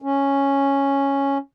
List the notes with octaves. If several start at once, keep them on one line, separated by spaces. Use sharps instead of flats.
C#4